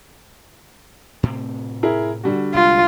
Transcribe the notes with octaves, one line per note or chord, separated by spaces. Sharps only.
A2 C3 C4
E4 G#4 A#4
D3 G3 F#4
C2 G#3 F4